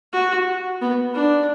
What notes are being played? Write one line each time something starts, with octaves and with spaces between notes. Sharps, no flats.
F#4
B3
D4